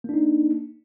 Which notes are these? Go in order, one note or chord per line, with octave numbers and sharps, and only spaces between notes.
A#3 D4 D#4